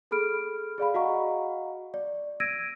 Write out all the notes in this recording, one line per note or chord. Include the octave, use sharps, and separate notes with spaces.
G#4 A4 B5 F6 D7
G#4 D5 F5 B5
F#4 D#5 F5 F#5 A#5 C#6
D5
E6 G#6 A#6 D7 D#7